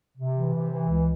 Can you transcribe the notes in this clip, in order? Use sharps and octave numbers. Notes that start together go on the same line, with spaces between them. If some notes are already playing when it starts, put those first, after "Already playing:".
C3
E3
C3
E3
C#2